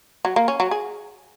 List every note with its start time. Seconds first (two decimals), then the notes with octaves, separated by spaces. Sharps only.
0.25 F#3
0.36 A#3
0.48 C#4
0.60 F#3
0.71 G#4